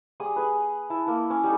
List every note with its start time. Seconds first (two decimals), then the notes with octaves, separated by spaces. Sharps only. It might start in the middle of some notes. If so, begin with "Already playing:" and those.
0.20 G3 G#4 D#6
0.36 G#4 B4
0.90 E4 A5
1.06 A#3 E4
1.30 C#4
1.44 G3 D#4 A4